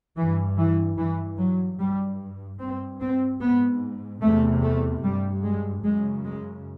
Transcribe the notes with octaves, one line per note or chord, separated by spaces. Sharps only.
G2 E3
E3
G2 E3
F#3
G2 G3
G2 C4
C4
G#2 B3
E2 C3 A3
A3
G2 G3
G#3
F#2 C#3 G#3
G#3